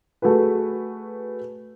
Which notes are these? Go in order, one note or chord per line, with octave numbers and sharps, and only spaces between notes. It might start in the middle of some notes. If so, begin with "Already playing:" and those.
A3 F#4 G#4 B4